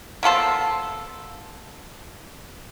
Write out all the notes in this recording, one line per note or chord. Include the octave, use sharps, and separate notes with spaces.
A#3 B3 A4 C5